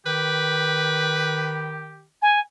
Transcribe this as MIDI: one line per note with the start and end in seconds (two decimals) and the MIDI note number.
0.06 2.07 51
0.06 2.04 67
0.06 1.78 71
2.22 2.39 80